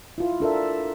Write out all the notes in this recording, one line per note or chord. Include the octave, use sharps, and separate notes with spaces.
E4 F4
D4 A4 A#4 E5